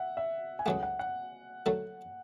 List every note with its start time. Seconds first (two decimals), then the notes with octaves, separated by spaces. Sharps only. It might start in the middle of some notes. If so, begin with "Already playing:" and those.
Already playing: E5 F#5
0.17 E5
0.59 G#5
0.66 C#2 C#3 F#3 A3 F#5
0.83 F#5
0.99 F#5
1.66 D3 F#3 A3